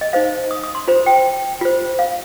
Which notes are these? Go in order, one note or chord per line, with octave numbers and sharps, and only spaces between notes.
D#5
D#4 C5 F5
D#6
D#6
C6
F4 C5 A#5
G5
F4 C5
F5